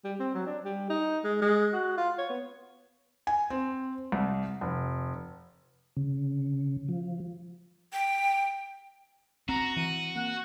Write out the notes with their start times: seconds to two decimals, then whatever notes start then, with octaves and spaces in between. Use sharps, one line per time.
0.04 G3
0.19 C4
0.34 F#3
0.47 D4
0.65 G3
0.90 D#4
1.24 G#3
1.41 G#3
1.73 F#4
1.97 F4
2.18 C#5
2.30 B3
3.27 G#5
3.50 C4
4.12 C2
4.61 F1
5.96 C#3
6.88 F3
7.93 G5
9.49 C4 F#4 A#5
9.77 E3 D#7
10.16 A#3 F#5